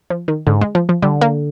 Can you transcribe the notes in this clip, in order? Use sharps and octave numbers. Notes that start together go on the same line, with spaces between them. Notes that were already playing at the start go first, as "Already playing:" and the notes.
F3
D#3
G#2 D3
G#3
F3
F3
D3 G3
A#3